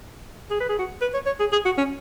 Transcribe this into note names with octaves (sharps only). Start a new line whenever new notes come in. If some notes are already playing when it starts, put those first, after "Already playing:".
G#4
B4
G#4
F#4
B4
C#5
C#5
G#4
G#4
F#4
C#4